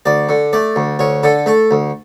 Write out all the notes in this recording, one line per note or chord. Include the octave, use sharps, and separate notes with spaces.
D2 D5
D3
A3 D5
D2
D2 C#5
D3 A4
A3 A4
D2